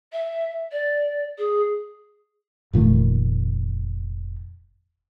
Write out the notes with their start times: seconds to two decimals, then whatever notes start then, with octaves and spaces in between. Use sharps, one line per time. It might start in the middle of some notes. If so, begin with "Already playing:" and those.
0.12 E5
0.71 D5
1.38 G#4
2.73 F1 A#2 D#3 A3